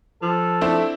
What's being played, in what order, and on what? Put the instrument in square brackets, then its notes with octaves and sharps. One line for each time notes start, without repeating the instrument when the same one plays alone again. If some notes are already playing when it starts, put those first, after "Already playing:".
[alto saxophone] F3 [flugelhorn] A4
[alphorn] A3 [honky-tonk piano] C4 D4 E4